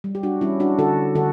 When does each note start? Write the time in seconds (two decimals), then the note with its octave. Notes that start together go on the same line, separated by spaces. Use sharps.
0.04 G3
0.15 G4
0.23 D4 F#4
0.41 G3 C#4 E4
0.60 D4 F#4
0.79 D3 F#4 A4
1.15 D3 F#4 A4